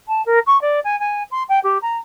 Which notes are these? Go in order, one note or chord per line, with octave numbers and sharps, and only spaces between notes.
A5
A#4
C#6
D5
G#5
G#5
C6
G5
G4
A#5